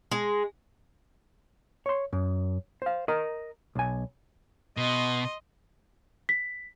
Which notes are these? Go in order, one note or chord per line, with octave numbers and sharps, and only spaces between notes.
G#3
C#5 C6
F#2
C5 F5
A#4 D#5 A#5
B1 G#5
B2 D#5 C6
B6